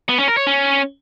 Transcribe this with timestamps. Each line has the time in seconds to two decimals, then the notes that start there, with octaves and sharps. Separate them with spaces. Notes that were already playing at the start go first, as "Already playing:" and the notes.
0.09 B3
0.18 C#4
0.28 A#4
0.37 C#5
0.47 C#4